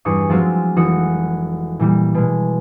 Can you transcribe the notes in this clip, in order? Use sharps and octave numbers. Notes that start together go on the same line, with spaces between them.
E2 G2 D4 G#4 C#6 D#6
F3 F#3 G#3 C4 F4
F1 E3 F#4 D#6 C#7 D#7
A#2 E3 G3
B2 G#3